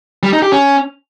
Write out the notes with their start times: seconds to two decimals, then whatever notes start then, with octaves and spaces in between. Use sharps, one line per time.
0.23 G3
0.33 D#4
0.42 G4
0.52 C#4